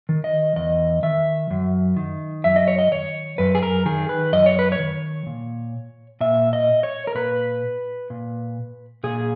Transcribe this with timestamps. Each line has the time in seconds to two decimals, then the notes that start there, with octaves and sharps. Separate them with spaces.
0.09 D#3
0.24 D#5
0.56 E2 D#5
1.03 D#3 E5
1.51 F#2
1.97 D#3
2.44 F#2 E5
2.56 D#5
2.68 C#5
2.79 D#5
2.92 D#3 C#5
3.38 F#2 B4
3.55 G#4
3.63 A#4
3.86 D#3 G#4
4.09 B4
4.33 F#2 D#5
4.46 C#5
4.59 B4
4.72 C#5
4.79 D#3
5.26 A#2
6.21 A#2 E5
6.53 D#5
6.83 C#5
7.07 A#4
7.15 A#2 B4
8.10 A#2
9.04 A#2 G#4